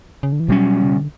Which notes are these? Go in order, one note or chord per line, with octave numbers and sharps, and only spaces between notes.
C#3
D3
E3
B2 F#3 G3 C#4
C#3
D3